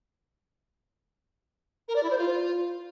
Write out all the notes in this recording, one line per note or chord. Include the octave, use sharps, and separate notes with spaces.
A#4
D5
E4
C5
F4